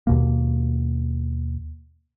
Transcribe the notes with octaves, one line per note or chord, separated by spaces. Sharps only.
D#2 B2 A#3